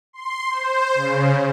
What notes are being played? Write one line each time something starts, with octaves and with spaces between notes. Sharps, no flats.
C6
C5
C#3